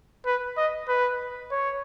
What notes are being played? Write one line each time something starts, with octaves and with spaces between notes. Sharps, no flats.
B4
D#5
B4
C#5